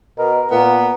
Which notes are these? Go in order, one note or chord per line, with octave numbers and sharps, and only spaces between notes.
B2 A#4
A#2 B3 A#4